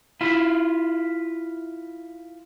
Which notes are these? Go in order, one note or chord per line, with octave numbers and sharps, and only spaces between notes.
E4 F4